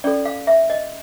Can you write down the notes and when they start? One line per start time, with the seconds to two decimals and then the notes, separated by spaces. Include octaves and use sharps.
0.04 C#4 F4 A4 D5
0.25 F5
0.47 E5
0.70 D#5